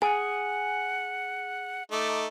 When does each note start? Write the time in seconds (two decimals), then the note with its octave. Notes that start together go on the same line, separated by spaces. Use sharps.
0.02 G#4 F#5 G#5
1.92 A3 D#4 D6